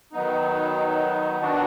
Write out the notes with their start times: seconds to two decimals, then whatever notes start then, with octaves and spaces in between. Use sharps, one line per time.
0.13 D#3 F#3 B3 D#4
1.41 D#3 F#3 B3 D4 F#4